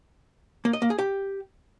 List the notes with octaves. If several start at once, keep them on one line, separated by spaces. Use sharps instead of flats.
A#3
D#5
A#3
G#4
G4